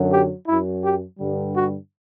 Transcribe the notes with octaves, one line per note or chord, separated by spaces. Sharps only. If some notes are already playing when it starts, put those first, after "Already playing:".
Already playing: F#2 D3 F#3
G4
F#2 F#3 E4
G4
G2 D3 G3
F#4